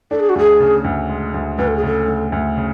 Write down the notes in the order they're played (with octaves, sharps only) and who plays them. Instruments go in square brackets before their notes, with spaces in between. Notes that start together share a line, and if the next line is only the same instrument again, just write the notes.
[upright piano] D4 [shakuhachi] A4
[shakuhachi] G#4
F#4
[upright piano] D2 [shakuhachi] G#4
[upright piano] C#3
D2
G#3
D2
[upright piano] D2 [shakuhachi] B4
[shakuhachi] A4
G#4
[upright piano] C#3 [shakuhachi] A4
[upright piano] D2
D2
C#3